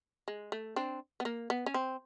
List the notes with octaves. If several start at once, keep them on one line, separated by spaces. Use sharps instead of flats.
G#3
A3
C4 D4
B3
A#3
B3
C#4
C4